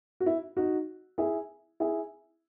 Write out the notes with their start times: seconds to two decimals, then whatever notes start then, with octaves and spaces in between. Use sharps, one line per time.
0.20 F#4
0.26 E4
0.57 D#4 F#4
1.18 E4 G#4
1.80 E4 G#4